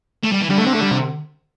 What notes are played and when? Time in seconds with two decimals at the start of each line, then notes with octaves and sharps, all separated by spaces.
0.24 A3
0.32 G3
0.42 E3
0.50 D3 G3
0.58 A3
0.67 C4
0.75 A3
0.82 G3
0.91 C3